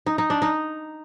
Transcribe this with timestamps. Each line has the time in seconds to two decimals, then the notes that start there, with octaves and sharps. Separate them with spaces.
0.06 D#4
0.18 D#4
0.30 D4
0.42 D#4